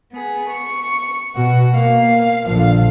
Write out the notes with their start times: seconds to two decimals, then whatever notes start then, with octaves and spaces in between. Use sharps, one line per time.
0.12 B3 G#4
0.48 C#6
1.34 B2 F#4
1.74 A#3 F5
2.46 A#1 D3 F3 F5